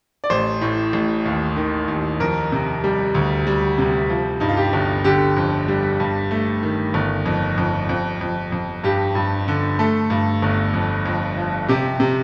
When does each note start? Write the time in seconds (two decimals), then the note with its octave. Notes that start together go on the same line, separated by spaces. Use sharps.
0.24 D5
0.30 A1 C5
0.61 A2
0.93 A1
1.25 D#2
1.56 D#3
1.88 D#2
2.20 F2 A#4
2.52 C3
2.84 G3
3.15 D2
3.47 G3
3.78 C3
4.09 F3
4.40 G2 D#4
4.49 F4
4.57 G4
4.73 G1
5.04 D3 G4
5.37 F2
5.68 G3
6.00 G2
6.31 A3
6.63 D#3
6.94 G1
7.26 F2
7.58 F2
7.89 F2
8.21 F2
8.52 F2
8.84 G2 G4
9.15 G2
9.48 D3
9.79 A3 A4
10.10 G2
10.42 G1
10.74 F2
11.05 F2
11.37 F3
11.68 C3 G4
12.00 C3